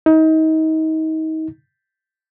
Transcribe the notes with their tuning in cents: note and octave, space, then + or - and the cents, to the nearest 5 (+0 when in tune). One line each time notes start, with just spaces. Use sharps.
D#4 +30